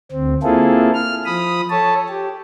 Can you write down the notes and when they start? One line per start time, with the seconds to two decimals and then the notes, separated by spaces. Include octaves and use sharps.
0.12 D2 C4
0.43 A#3 C4 E4 F4 G#4 A4
0.94 F6
1.26 F3 B5 D#6
1.70 A4 C#5 A5
2.09 G4